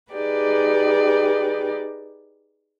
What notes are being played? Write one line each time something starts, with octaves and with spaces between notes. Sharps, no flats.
D#4 G4 G#4 B4 D5